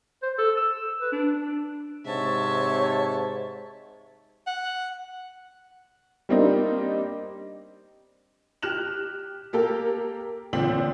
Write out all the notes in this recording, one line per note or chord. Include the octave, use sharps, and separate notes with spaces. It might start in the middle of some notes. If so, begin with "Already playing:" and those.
C5
A4
E6
B4
D4
G#2 C3 C#5 E5 A5
F#5
G3 A#3 C4 D4 D#4 G4
G4 F6 F#6 E7 F#7
A#3 G4 A4 A#4
A1 A#2 D3 C4 B6 F#7